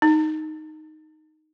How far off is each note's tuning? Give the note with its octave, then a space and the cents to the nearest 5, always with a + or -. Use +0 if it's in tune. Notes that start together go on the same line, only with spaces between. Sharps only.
D#4 +0